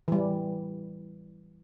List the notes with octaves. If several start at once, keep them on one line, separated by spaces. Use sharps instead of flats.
E3 G3